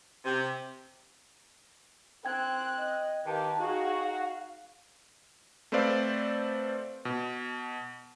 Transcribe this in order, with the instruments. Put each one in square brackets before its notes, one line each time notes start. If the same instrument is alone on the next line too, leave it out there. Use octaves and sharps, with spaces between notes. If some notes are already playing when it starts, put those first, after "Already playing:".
[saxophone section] C3
[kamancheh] C4 F#6 [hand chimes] G5 G#6
[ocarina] D#5
[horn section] D#3 G4 [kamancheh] B4 F5 [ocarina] A5
[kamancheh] D#4 G#4 [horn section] F#4 [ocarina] F5
[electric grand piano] A3 C4 B4 C5 D5 F5
B2